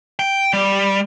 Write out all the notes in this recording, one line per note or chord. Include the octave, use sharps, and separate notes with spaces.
G5
G3